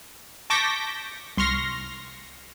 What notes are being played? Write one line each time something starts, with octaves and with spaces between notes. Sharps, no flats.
A5 C#6 D6 G6 A#6 B6
C2 C6 C#6 F6 A#6